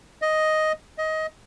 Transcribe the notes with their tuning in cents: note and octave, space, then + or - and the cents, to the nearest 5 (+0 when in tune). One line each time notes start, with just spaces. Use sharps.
D#5 +5
D#5 +20